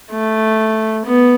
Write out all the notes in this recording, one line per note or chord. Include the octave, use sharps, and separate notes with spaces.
A3
B3